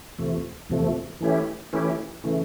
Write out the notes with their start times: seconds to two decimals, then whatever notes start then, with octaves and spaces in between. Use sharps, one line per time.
0.19 E2 C3 F3 A3
0.70 E2 C3 F3 A3
1.21 E3 A3 C#4 E4 G4
1.73 E3 A3 C#4 E4 G4
2.24 C#3 E3 A3